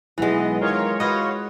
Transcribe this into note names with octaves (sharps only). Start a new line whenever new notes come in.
B1 E3 G#3 B3 D#5
D#3 F4 A#4 C#5
F4 F#4 B4 D#5